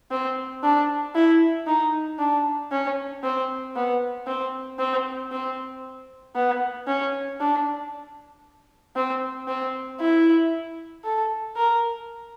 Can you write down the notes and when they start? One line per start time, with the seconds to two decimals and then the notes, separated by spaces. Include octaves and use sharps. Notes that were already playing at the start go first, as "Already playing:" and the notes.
0.11 C4
0.63 D4
1.15 E4
1.67 D#4
2.19 D4
2.71 C#4
3.24 C4
3.76 B3
4.27 C4
4.79 C4
5.32 C4
6.36 B3
6.87 C#4
7.40 D4
8.96 C4
9.48 C4
10.01 E4
11.04 A4
11.56 A#4